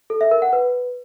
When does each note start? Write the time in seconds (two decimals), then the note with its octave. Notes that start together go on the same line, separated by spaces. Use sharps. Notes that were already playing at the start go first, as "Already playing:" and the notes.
0.10 A4
0.21 E5
0.31 A#4
0.42 F#5
0.53 B4